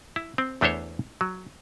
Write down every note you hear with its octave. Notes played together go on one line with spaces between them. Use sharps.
E4
C4
E2 A3 D4 E4 C5 C#5
F#3